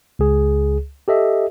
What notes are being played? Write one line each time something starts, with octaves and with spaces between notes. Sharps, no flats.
C#2 G#4
G4 A4 D#5 E5